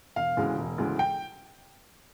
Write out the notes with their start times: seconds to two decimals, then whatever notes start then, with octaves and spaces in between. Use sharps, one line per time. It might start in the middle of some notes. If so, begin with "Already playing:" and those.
0.16 E1 F5
0.37 D2 C#3 E3 G#3
0.58 E1
0.78 D2 C#3 E3 G#3
0.99 G5